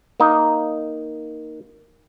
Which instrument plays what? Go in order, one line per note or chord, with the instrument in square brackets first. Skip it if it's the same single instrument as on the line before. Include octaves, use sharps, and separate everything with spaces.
[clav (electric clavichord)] A#3 D#4